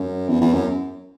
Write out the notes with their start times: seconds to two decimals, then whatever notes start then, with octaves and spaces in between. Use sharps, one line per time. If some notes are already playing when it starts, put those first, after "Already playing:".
Already playing: F#2
0.28 E2
0.41 E2
0.53 F#2